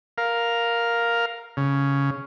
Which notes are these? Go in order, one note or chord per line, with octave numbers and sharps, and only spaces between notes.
A#4 F5
C#3